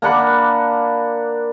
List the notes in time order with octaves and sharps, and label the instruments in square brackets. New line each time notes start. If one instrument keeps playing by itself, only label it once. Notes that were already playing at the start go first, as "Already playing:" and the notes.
[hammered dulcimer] A#3 D4 F#5 B5